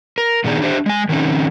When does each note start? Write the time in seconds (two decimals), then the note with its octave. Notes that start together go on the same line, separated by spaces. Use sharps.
0.18 A#4
0.44 A#2 D#3 B3 D4 D#4 G#4
0.62 D4 G4 C5 D#5 E5
0.86 G#3 G#5
1.09 D#3 F3 C4 C#4 D#4